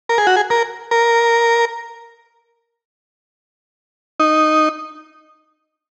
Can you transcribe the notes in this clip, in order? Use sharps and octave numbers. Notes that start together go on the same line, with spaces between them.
A#4
G#4
F#4
G#4
A#4
A#4
D#4